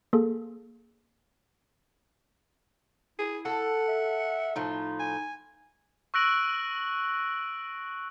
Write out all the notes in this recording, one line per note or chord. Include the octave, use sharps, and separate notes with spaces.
A#3 G#4 A4
E4 G#4
A4 F#5
E5
A2 F3 D#4 F4
G#5
C#6 E6 F#6 A#6 D7 F#7